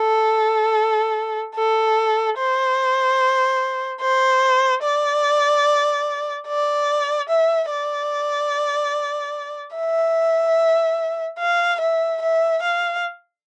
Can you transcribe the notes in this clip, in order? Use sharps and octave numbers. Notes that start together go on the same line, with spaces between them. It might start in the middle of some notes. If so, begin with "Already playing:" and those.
Already playing: A4
A4
C5
C5
D5
D5
E5
D5
E5
F5
E5
E5
F5